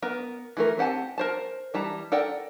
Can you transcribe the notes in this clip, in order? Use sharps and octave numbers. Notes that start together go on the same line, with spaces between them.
B3 A#4 A#5
E3 A3 A#4
C4 G4 F#5 G#5 A5
A#4 C5 A5
E3 G3 A5 A#5
A4 A#4 D5 F#5 G5